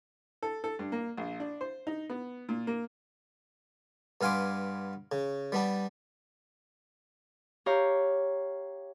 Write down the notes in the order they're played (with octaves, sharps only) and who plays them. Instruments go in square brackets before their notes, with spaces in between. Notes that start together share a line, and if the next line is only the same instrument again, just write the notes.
[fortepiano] A4
A4
G2
A#3
A#1
D4
C5
D#4
B3
A#2
A#3
[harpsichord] G2 B3 F5 G#5 C6 D6
C#3
G3 B3 D4
[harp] G4 C#5 F5 A#5